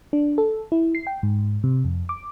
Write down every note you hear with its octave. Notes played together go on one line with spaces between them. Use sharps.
D4
A4
E4
C7
G5
G#2
C3
F2
D6